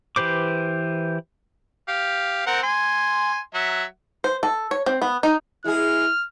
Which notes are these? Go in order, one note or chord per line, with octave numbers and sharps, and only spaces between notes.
E3 G4 B4 C5 D6
G4 F5
C4 A#4 F#5
G#5 C6
F#3 E5 F#5
C5
A4
C#5
C4
B3
D#4
G#3 B3 E4 G#4 F6